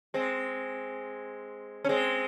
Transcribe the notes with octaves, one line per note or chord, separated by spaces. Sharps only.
G#3 C4
C#4
G#3 C4